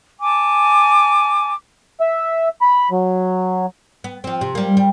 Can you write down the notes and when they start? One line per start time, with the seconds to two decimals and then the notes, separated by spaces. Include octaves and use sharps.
0.21 G#5 A5 D6
2.00 E5
2.61 B5
2.91 F#3
4.04 B3
4.24 F3 C4
4.41 C3
4.55 G3 A#3
4.77 G3